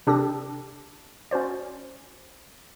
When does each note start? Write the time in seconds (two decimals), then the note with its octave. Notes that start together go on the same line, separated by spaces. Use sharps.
0.07 C3 D4 G4 A4 A#6
1.31 C#4 F#4 C5 D5